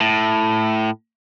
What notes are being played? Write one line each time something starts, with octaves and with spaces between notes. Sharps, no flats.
A2